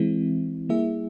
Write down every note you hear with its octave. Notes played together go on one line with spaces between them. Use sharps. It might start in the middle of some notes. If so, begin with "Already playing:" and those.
Already playing: E3 G#3 C4 E4
G3 A#3 E4 G#4 E5